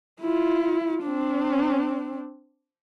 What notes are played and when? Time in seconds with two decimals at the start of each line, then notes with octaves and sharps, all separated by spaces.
0.21 E4 F4
1.02 C4 D4